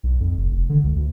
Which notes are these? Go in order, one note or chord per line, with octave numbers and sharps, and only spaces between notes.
B1
F2
F1
F1
D3
C#2
D2